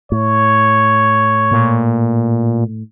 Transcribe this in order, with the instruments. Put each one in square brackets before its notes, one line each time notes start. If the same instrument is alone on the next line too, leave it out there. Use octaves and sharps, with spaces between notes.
[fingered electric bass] A2 [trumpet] C#5
[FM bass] A#2